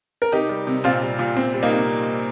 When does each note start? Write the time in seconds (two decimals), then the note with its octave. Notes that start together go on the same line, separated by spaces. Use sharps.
0.22 A#4
0.32 C3 D#4 G4
0.49 G3
0.67 C3
0.84 A#2 C4 F4
1.02 G3
1.19 A#2
1.36 C3 C4
1.54 G3
1.63 A#3 D#4
1.72 C3